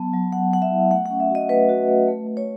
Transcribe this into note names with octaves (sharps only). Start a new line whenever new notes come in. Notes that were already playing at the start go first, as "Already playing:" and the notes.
Already playing: F#3 B3 A5
F#3
F#3 F#5
F#3 F#5
E5
E4
A3 F#5
C#4 F#5
E5
F#4 D#5
A3 B4
F#4
A3
A3
A3
C#5